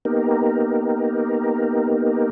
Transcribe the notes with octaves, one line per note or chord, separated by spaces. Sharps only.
A#3 B3 D#4 G4 A#4